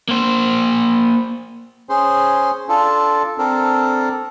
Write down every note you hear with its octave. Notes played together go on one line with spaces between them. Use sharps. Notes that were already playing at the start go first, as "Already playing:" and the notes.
A#3 C5
C#4 G#4 C5
D4 F4 A4
C4 D4 A4 A#4